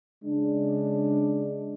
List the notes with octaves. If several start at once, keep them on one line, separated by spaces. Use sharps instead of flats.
C#3 G#3 D4